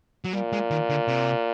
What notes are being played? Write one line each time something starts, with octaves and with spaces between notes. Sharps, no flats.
F#3
A#2 G3
G#3
D#3
D3
C3